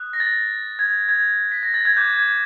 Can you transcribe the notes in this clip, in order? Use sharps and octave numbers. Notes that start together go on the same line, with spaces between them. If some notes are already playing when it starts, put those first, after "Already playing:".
Already playing: D#6 F#6
A#6
A6
G#6
G#6
B6
A#6
A6
G#6
D6 F#6 G6
G#6